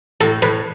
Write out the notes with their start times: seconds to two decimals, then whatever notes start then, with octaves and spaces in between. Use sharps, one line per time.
0.21 A2 A4
0.42 A2 B4